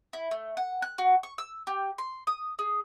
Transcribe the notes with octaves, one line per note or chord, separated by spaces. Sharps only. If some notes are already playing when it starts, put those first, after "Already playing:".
E4
A3
F#5
F#6
F#4
C#6
E6
G4
C6
D#6
G#4